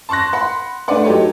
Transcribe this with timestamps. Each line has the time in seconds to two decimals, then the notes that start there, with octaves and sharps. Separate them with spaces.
0.09 A5 C6 C#6 F#6 A#6
0.33 F#5 B5 C6
0.88 A3 D4 B4 D5 F#5
1.05 F#3 D#4 G4 A4 C#5